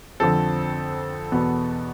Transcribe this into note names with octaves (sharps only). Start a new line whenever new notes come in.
F2 D3 F3 C4 A4
E2 B2 B3